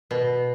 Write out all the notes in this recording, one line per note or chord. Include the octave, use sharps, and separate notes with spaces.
B2